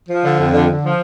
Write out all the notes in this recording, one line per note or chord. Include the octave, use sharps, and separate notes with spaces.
F3
D3
F2
D3
D3
F3